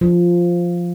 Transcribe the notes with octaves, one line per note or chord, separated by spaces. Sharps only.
F3